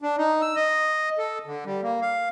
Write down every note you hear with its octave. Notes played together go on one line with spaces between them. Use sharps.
D4
D#4
E6
D#5
A4
D3
G3
A#3
F5